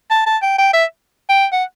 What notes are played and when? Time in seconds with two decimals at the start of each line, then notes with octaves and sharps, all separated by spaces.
0.11 A5
0.26 A5
0.42 G5
0.58 G5
0.73 E5
1.29 G5
1.53 F#5